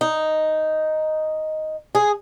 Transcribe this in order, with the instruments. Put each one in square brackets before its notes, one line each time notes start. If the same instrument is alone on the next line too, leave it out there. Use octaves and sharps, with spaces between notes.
[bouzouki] D#4
G#4